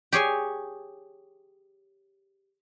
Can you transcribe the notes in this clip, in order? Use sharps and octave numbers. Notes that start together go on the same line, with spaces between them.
G4 G#4 C#5 G#5